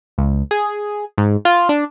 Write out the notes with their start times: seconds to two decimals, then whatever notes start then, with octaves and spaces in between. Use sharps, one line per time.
0.18 C#2
0.51 G#4
1.18 G#2
1.45 F4
1.69 D4